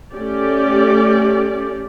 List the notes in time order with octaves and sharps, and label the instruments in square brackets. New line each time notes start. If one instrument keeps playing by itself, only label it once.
[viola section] A3 C#4 G4 D5